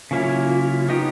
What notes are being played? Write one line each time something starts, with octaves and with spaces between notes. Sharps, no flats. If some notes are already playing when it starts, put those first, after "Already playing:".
C#3 F#3 A#3 C#4 E4 F4
B3 D#4 G4